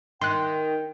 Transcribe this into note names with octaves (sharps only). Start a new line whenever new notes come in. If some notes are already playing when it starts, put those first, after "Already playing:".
D#3 G5 C6 F#6